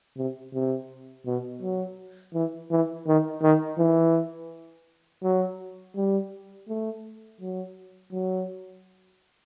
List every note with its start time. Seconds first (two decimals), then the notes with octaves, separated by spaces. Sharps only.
0.17 C3
0.54 C3
1.26 B2
1.62 F#3
2.34 E3
2.71 E3
3.07 D#3
3.42 D#3
3.78 E3
5.23 F#3
5.96 G3
6.68 A3
7.41 F#3
8.12 F#3